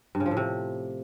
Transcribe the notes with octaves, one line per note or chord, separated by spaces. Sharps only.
G2
C#3
F3
A2
C3